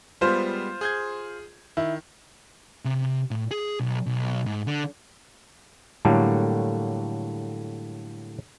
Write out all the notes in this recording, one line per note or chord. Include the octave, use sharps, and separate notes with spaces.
G3 G#3 B3 F4 C5
G#4 G6 G#6
D#3 E4
C3
A2
G#4
B1
B1
G#2
D3
A2 D3 F#3 G3 A#3